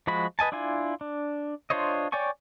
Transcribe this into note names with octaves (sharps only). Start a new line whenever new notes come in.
F3 G#3 F#4 B5
B4 D#5 G#5 A5
D4 E4 F4 G#5
D4
D4 F4 C5 C#5 D#5
C#5 D5 G5 G#5 C#6